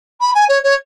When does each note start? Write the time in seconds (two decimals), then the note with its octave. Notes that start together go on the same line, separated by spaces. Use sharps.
0.21 B5
0.34 G#5
0.48 C#5
0.63 C#5